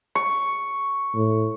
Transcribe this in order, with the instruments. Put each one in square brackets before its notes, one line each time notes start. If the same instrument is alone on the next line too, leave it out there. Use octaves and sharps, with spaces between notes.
[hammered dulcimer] C#6
[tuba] A2